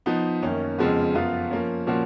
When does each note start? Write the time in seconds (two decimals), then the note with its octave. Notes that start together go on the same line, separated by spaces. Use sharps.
0.06 F3 B3 D#4
0.42 F#2 D#3 A#3 C#4
0.78 F2 C#3 F3 G#3 B3
1.15 F#2 F3 B3 F4
1.51 F3 A#3 C#4
1.87 A#2 F3 A#3 C#4 F#4